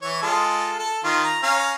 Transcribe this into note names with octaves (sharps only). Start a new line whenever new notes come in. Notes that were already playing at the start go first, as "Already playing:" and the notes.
E3 C#5
G#3 F4 A4
A4
D#3 F4
A#5
C#4 F5 A#5